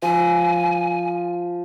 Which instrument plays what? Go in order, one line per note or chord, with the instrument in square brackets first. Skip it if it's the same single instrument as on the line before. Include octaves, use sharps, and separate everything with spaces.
[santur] F3 [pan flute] G#5